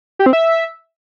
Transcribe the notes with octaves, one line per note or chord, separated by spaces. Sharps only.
G4
C4
E5